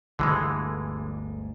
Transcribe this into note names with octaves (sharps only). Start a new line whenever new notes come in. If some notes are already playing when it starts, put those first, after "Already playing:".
G1 D2 G#2 D3 E3 G#3